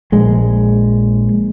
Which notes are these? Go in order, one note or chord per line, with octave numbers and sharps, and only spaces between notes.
A#1 G#3